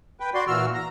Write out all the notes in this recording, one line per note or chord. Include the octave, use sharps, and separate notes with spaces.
B4 G5
F#4 D5 C6
A#2 E3 F#4 E6 F6
A#5